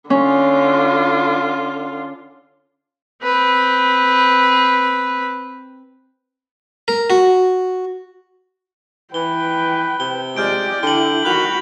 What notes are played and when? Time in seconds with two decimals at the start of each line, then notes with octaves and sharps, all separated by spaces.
0.10 D3 C#4 F4
3.23 C4 B4
6.88 A#4
7.10 F#4
9.14 E3 B4 G5 G7
10.00 C3 G7
10.36 G#3 G4 D5 F6 G6 D7
10.83 D3 E4 G5 F#7 G7
11.25 D#3 F#4 B5 F#6 F7